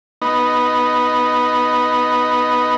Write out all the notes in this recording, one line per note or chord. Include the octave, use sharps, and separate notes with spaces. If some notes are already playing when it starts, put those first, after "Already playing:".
B3 D#4